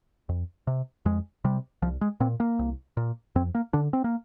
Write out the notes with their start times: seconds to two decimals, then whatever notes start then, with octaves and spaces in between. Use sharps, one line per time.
0.29 F2
0.67 C3
1.05 F2 G#3
1.45 C3 G3
1.82 C2 F3
2.01 G#3
2.20 A#2 C4
2.40 A#3
2.59 C2
2.97 A#2
3.35 F2 C4
3.55 A#3
3.73 D3 D4
3.93 C4
4.04 A#3